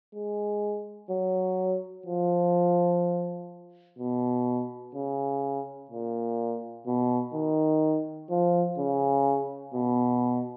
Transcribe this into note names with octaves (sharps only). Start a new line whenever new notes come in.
G#3
F#3
F3
B2
C#3
A#2
B2
D#3
F3
C#3
B2